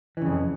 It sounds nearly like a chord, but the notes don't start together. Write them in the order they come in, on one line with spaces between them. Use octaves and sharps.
E3 C#3 F2